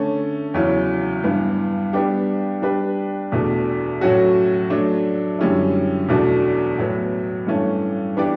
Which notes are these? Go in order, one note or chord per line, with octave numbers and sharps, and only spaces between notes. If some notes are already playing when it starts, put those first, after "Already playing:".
Already playing: D3 A3 C#4
E2 C#3 F#3 C#4 E4
G2 E3 B3
G3 B3 D4 G4
G3 D4 G4 B4
E2 B2 A3 D4
A2 F#3 A3 C#4 F#4
F#3 A3 D4
F#2 D3 G3 C#4 E4
E2 B2 A3 D4 F#4
A2 F#3 B3
G2 E3 A3 C#4
E3 B3 D4 G4 D5